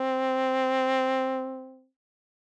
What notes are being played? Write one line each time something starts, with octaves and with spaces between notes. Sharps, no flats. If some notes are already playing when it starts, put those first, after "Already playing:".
Already playing: C4